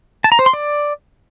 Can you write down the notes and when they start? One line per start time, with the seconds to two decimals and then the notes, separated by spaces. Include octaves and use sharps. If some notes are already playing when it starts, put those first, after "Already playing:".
0.24 A5
0.32 A#5
0.39 C5
0.46 C6
0.53 D5